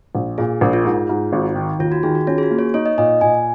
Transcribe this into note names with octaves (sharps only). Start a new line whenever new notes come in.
A#1
A#2 G#4
A#1 A#4
F4
G#2
G#2
G#1
D#3
D#2 F4
F#4
D#3 G#4
F#4
C#4 F4
G#4
F#4
A#3
C#5
D#4 C#5
D#5
A#2 D#5
A#2 G#5